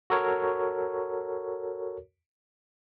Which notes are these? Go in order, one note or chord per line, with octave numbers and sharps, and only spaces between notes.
F#4 A4 A#4 C#5